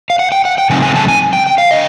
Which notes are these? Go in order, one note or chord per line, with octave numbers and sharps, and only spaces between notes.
F5
F#5
G5
F#5
G5
C#3 F#3 A3 C4 D#4 G#5
G#5
A5
G#5
G5
G5
F5
D3 D#5